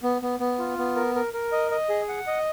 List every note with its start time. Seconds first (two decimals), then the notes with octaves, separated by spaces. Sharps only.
0.03 B3
0.22 B3
0.40 B3
0.59 F4
0.78 B3
0.96 A#4
1.15 A#4
1.33 A#4
1.52 D#5
1.71 D#5
1.89 G#4
2.08 F#5
2.27 D#5